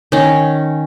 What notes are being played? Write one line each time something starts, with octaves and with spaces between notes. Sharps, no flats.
D#3 C#4